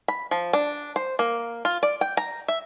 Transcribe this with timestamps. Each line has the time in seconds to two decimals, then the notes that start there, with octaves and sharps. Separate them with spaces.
0.08 B5
0.31 F3
0.53 D4
0.96 C5
1.19 A#3
1.65 F4
1.83 D5
2.01 G5
2.17 A#5
2.48 E5